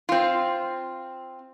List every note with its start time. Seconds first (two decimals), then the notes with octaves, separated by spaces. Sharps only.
0.09 C4 F4